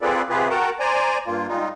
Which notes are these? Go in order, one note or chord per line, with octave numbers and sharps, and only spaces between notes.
C4 F4 G#4 A4 B4 D5
C3 F4 G4 G#4 B4
F#4 A#4 F#5 G5 A5 A#5
C5 D5 G#5 A#5
G2 A#3 F4
G3 G#3 D#4 F4